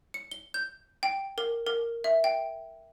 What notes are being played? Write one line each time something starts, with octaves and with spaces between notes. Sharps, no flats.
C#7
G7
G6
G5
A#4
A#4
E5
G5